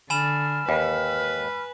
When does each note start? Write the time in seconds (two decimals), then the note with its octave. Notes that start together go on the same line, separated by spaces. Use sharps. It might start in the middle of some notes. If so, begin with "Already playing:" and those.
0.10 D3 G#5 B5 F6 E7
0.69 D#2 B4